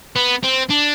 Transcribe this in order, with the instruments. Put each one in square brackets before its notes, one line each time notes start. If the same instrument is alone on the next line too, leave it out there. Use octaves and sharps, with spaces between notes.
[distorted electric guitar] B3
C4
D4